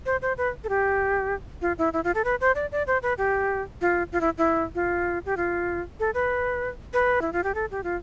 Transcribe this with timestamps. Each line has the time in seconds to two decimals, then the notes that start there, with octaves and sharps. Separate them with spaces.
0.06 C5
0.22 C5
0.38 B4
0.64 A4
0.69 G4
1.62 F4
1.78 E4
1.93 E4
2.04 F4
2.15 A4
2.25 B4
2.41 C5
2.55 D5
2.72 D5
2.87 C5
3.03 B4
3.18 G4
3.81 F4
4.12 F4
4.21 E4
4.38 E4
4.75 F4
5.26 G4
5.37 F4
6.00 A4
6.14 B4
6.93 B4
7.22 E4
7.33 F4
7.44 G4
7.55 A4
7.71 G4
7.84 F4